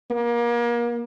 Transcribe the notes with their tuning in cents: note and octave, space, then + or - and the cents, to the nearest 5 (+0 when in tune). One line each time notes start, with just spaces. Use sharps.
A#3 +30